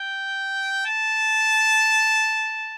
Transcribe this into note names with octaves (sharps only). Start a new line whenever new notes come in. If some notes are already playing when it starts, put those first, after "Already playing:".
Already playing: G5
A5